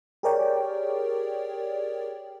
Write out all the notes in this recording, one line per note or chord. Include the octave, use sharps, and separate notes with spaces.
G4 G#4 A#4 C#5 D5 G5